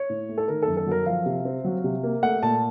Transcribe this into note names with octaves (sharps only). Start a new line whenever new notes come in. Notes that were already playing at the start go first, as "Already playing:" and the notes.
Already playing: C#5
A2
A3
A4
D#3 A#4
A4
F#2
A4
F#3 A#4
F3 F5
C3
C4
F#3
C3
A#3
A3 F#5
A#2 A5